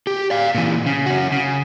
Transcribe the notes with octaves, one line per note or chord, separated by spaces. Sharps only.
G4
D5 F5
A#2 E3
C#3
C#4 F#4
C#3